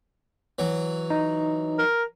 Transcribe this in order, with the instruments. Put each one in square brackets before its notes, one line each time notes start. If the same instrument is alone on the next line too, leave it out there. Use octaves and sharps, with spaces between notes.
[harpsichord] E3 F#3
[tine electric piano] D#4
[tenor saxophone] A#4